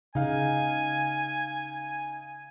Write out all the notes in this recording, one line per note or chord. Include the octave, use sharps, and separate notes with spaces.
C#3 D#4 F5 G#5